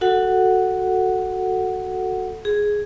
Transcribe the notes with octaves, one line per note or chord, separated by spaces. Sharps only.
F#4 A4 F#5
G#4